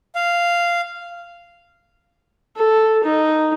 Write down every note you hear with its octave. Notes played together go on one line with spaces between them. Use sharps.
F5
A4
D#4